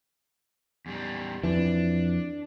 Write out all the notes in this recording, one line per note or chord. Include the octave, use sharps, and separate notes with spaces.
E2 G3
F2 E3 D4